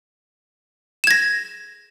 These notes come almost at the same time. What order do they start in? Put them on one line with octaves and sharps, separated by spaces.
E7 G#6 A#6